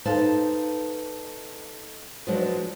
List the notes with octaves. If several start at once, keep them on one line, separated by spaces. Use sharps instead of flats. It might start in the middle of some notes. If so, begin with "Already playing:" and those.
D#4 A4 B4 C5 F5 A5
F3 F#3 G#3 D4 B4